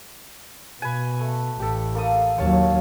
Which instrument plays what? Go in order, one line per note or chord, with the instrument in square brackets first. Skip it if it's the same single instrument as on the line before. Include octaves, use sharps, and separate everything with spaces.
[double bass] B2 [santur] B4 G#5
[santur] A3
[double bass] A1 [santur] G4 A4
[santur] A#3 A4 D#6
[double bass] D#2 F#3 [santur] C#5 F5 A5